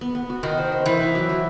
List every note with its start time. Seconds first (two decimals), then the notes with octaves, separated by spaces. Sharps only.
0.01 B3
0.15 B3
0.30 F#4
0.43 D#3 F#4
0.57 C5
0.72 C5
0.86 E3 E4
1.01 E4
1.15 F#3
1.29 F#3